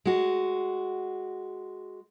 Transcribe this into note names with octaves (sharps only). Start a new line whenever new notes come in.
G#3 F#4